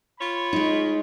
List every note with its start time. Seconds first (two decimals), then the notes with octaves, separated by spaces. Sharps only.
0.20 F4 C#5 B5
0.53 G#3 D#4